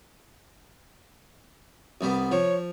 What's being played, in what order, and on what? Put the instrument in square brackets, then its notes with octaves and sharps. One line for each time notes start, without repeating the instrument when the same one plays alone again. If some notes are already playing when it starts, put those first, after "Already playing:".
[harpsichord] C2 G3 B3
[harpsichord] F3 [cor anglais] C#5